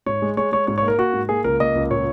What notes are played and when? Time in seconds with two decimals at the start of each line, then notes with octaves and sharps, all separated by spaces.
0.06 G#2 C#5
0.22 G#3
0.37 G#3 C#5
0.52 G#3 C#5
0.67 G#2 C#5
0.78 C#5
0.83 A#3
0.88 A#4
0.98 A#3 F#4
1.13 G#2
1.29 A#3 G#4
1.44 C#2 A#4
1.60 A#3 D#5
1.75 C#2
1.90 A#2 C#5